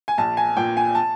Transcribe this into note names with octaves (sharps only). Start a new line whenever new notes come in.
G#5
A#1 A5
G#5
A#2 G5
G#5
A5